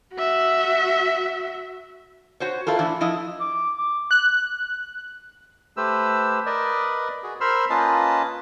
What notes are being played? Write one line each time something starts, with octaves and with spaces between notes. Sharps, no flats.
F#4 E5
F#4 C5 C#5
E4 F4 A4 A#4
A2 E3 D4 E4
F3 E4 D#5
D6
D6
F#6
A3 G4 B4 C5 E6
A#4 B4 D5 D#5
F#4 G#4
A#4 C5 B5 C6 E6 F6
A#3 C#4 F4 B4 D#5 A5